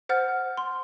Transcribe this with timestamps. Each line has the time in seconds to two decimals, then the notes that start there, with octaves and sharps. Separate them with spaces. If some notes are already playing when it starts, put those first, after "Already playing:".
0.09 C5 F#5 F6 A6
0.57 C6